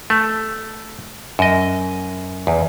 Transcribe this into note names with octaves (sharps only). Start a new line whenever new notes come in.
A3
F#2 D#5
E2